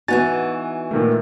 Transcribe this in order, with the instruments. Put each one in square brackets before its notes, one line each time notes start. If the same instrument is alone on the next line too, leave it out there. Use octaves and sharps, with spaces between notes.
[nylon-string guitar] E3 B3 D#4 [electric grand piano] F#4 G#5 A6
[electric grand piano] A#2 D#3 A3